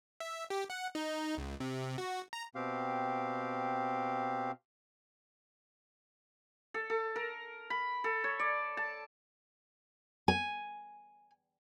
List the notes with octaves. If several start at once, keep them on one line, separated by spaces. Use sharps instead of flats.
E5
G4
F#5
D#4
C#2
C3
F#4
A#5
B2 C4 G4 F5
A4
A4
A#4
B5
A4
C#5
D5
A5
G#5